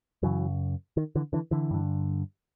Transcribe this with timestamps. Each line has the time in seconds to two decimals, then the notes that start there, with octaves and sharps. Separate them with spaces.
0.23 F#2 C#3 E3 F#3
0.97 D#3
1.15 D3 E3
1.33 D3 E3
1.51 D3 E3
1.71 G2 D3